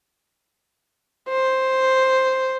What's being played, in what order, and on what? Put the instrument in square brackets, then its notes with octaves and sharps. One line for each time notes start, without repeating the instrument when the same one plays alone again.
[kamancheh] C5